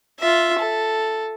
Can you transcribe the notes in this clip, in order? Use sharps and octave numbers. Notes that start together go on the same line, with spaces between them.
F4 E5
A4